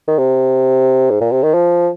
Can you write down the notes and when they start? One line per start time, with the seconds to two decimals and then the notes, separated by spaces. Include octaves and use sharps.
0.07 D#3
0.19 C3
1.10 G#2
1.21 A#2
1.31 C3
1.43 D#3
1.54 F3